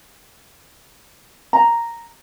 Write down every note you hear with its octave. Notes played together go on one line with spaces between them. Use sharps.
A#5